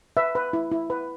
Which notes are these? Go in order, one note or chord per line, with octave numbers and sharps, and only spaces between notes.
B4 E5
B4
E4
E4
B4